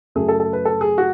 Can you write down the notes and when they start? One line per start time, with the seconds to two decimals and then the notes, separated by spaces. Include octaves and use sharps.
0.15 F#2 C#3 F#3 A3 G#4
0.29 A4
0.40 A4
0.53 B4
0.65 A4
0.81 G#4
0.98 F#4